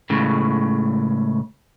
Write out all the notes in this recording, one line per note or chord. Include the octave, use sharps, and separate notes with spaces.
C#2 A2 C#3